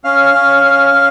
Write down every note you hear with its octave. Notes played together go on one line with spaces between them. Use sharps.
C#4 F5
C#4
C#4
C#4